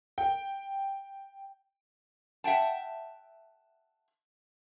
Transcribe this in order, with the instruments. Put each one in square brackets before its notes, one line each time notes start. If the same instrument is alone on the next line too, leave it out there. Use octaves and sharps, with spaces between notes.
[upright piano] G5
[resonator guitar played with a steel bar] E5 F#5 G5 A5